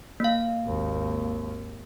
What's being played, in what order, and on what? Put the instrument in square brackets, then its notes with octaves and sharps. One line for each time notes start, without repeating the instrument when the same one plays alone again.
[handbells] A#3 F5
[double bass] G#1 D#2